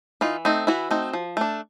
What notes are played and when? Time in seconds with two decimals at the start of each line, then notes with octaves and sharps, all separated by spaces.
0.21 E3 D#4 F4
0.45 A3 C4 D#4
0.67 E3 E4 F#4
0.91 A3 C4 D#4
1.13 F3
1.37 A3 D4